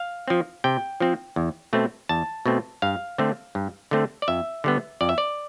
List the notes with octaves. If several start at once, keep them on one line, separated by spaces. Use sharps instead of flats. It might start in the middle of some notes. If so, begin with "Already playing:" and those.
Already playing: F5
F3 C4
C3 G5
F3 C4
E2
B2 A3 C4
E2 A5
B2 A3 C4
G2 F5
D3 A3 C4
G2
D3 A3 C4
D5
F2 E5
D3 G3 B3
F2 D5
E5
D5